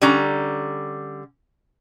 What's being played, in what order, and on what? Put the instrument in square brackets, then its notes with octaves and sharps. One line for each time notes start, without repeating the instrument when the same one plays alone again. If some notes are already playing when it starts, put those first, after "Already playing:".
[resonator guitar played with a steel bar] D3 G3 C#4 A#5